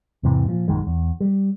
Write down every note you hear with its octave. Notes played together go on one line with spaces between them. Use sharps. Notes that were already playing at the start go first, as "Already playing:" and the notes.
E2 G#2 C3 E3
A#2 F3
A#1 F#2 D#3 G#3
E2
G3